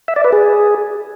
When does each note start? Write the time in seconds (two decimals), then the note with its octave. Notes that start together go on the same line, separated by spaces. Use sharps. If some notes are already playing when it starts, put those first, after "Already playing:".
0.08 E5
0.16 D5
0.24 B4
0.32 G#4